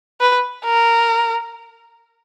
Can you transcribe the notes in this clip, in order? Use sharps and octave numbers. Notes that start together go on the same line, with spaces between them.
B4
A#4